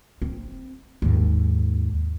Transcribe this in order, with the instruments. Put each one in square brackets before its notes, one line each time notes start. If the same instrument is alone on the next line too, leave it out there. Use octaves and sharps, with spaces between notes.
[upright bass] C4
D#2 G#2